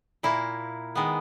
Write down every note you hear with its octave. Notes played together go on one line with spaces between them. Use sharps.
A#2 A#3 E4
D#3 G#3 B3